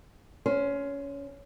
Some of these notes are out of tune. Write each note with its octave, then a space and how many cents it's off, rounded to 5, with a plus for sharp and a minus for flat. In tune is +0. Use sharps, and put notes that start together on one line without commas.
C#4 +20 C5 -10